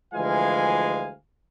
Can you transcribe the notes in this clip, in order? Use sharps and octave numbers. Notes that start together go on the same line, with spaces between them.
D2 E3 F3 G#3 F5 G#5